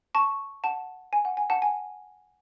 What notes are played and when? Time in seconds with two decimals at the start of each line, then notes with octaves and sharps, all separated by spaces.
0.15 A5 C#6
0.64 F#5 A5
1.13 G#5
1.25 F#5
1.37 G#5
1.50 F#5 A5
1.62 G#5